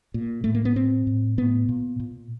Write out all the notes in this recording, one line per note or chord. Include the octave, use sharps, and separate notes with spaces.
A#2
A2 A3
A#3
B3
A2 C4
A2
A2 B3
A#2
A#2